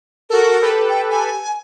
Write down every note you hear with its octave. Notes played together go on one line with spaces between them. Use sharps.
F#4 A4 A#4
G4 A4 B4
G5
G#5